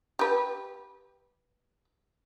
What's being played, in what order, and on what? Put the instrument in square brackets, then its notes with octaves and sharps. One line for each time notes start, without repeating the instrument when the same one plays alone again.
[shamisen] G4 B4